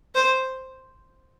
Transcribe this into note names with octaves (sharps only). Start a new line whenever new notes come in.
C5